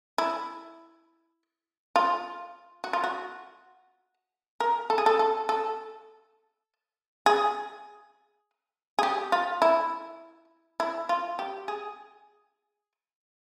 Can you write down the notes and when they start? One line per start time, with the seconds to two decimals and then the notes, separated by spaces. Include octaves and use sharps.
0.18 E4
1.96 F4
2.84 F#4
2.93 F4
3.04 F#4
4.60 A#4
4.90 A4
4.98 G#4
5.06 A4
5.19 A4
5.49 A4
7.26 G#4
8.99 G#4
9.03 G4
9.32 F4
9.62 E4
10.80 E4
11.09 F4
11.39 G4
11.68 G#4